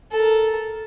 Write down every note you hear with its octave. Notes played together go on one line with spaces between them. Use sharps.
A4 A#4